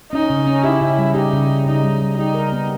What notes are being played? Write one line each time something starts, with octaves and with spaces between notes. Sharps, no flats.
C#4 D#4
C#3
C#4
E4 G4
C#3
G3
D#4 G4
C#3
C#3
C#3 D#4
G3
G3
D#4 G4
A#4
B3